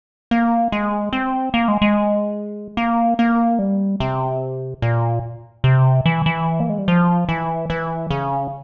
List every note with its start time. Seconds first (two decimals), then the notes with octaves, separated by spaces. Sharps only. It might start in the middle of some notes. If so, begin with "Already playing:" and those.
0.31 A#3
0.72 G#3
1.13 C4
1.54 A#3
1.68 G#3
1.82 G#3
2.77 A#3
3.19 A#3
3.59 G3
4.00 C3
4.82 A#2
5.64 C3
6.06 E3
6.26 E3
6.60 A#3
6.69 G#3
6.78 G3
6.88 F3
7.29 E3
7.70 E3
8.10 C#3